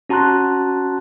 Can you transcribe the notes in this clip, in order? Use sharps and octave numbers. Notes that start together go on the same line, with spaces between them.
C#4 F#4 A5 A#5 C6 F#6